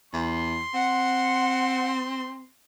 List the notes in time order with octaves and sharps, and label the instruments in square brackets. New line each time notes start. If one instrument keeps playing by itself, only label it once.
[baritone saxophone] E2 [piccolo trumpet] C6
[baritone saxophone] C4 [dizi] F#5